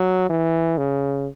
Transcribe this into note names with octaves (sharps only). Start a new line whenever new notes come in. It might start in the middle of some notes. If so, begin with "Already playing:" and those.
Already playing: F#3
E3
C#3